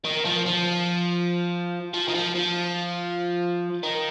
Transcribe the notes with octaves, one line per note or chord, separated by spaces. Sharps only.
D#3
F3
F3
F3
D#3
F3
F3
D#3